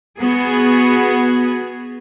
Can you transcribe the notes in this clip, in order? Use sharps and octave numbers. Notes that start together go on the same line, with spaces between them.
B3 F#4 G#4